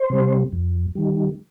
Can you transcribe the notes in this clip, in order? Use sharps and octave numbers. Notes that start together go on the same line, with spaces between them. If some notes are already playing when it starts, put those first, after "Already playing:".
Already playing: C5
C3 G3
F2
D#3 G3